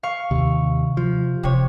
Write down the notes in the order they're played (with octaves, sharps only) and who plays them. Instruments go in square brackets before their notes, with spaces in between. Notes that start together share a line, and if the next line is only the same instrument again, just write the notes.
[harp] F5 C#6
[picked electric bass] D#2 [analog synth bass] C3
[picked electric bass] F3
[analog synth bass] E1 [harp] C3 C#5